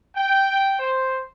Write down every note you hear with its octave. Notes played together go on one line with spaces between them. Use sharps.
G5
C5